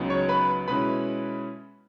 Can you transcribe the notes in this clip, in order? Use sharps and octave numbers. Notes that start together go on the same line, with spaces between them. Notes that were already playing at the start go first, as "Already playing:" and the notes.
Already playing: C#2 C#3 F#3 B3 D#4
C#5 C#6
B4 B5
B2 G#3 C#4 E4 B4 B5